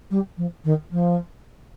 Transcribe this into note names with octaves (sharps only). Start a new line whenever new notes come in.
G3
F3
D#3
F3